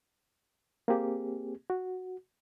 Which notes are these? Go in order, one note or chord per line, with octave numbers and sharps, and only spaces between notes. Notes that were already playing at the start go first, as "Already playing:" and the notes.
A#3 C4 G4 G#4
F#4